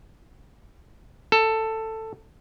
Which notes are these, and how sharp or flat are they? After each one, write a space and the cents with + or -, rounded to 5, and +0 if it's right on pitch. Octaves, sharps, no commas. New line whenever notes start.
A4 +10